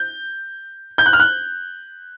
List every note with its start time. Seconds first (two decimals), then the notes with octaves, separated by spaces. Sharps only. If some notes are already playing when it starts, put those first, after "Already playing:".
Already playing: G6
0.98 G6
1.06 F#6
1.13 F6
1.20 F#6